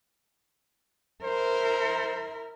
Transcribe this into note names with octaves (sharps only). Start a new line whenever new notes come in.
E4 A#4 C5